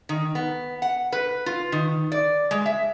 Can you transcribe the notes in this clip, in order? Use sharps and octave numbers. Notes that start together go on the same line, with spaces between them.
D#3
B3
F#5
B4
F4
D#3
D5
G#3
E5